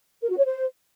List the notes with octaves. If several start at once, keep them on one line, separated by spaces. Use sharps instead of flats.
A#4
F#4
C#5
C5